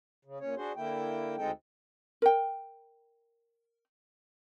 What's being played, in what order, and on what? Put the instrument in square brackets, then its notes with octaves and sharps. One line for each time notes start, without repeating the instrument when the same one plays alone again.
[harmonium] C#3
A#2 C#4 C#5
D4 F#4 G#4 C5
D3 A#3 E4 G5
D2 G#3 C4 D#4 A4 G5
[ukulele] A#4 G5